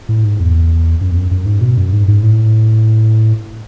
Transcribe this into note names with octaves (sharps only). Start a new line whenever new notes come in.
A2
G#2
E2
F#2
E2
F#2
F#2
G#2
B2
F#2
G#2
G#2
A2